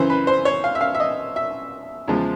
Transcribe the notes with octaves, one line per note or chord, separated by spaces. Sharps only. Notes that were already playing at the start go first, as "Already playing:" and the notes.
Already playing: F#2 C#3 E3 C5
B4
C5
C#5
F5
E5
F5
E5
D#5
E5
E2 C#3 F3 G#3